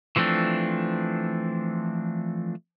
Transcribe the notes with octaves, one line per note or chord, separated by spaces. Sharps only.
E3 F3 A3 C4 D4